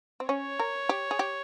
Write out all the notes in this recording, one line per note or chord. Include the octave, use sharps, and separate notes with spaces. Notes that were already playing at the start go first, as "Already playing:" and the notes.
C4
C#4 C#5
A#4
G4
G#4
G4